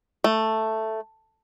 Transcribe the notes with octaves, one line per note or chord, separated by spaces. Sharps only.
A3